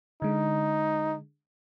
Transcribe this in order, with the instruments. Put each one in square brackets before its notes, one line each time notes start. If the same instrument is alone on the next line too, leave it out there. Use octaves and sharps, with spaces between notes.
[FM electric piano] D3 G#3 [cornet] D#4